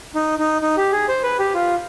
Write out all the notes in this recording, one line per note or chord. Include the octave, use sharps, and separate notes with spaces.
D#4
D#4
D#4
G4
G#4
C5
B4
G4
F4